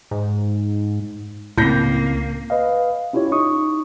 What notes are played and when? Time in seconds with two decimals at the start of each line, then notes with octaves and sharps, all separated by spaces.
0.11 G#2
1.58 C#2 A2 C#3 A#3 C4 G6 A#6
2.50 B4 D#5 F5
3.13 C#4 E4 F4 G4 C#5
3.32 D#4 C#6 D#6